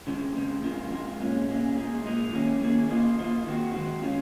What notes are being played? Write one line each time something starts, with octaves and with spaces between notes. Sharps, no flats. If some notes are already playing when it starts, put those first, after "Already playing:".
C#3 G#3 C4
C#3 G#3 C4
G#3 C4 F4 A#4
G#3 C4 F4 A#4
A#2 G#3 C#4
A#2 G#3 C#4
A#2 G#3 D#4
A#2 G#3 D#4
D#3 A#3 C#4 G#4
D#3 A#3 C#4 G#4
A#3 F4 C5 D#5
A#3 F4 C5 D#5
D#3 G#3 C4 F#4
D#3 G#3 C4 F#4
G#3 C#4 F4